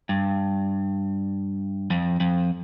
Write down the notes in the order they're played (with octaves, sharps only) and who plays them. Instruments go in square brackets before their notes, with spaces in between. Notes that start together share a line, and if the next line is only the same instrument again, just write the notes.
[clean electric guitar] G2
F2
F2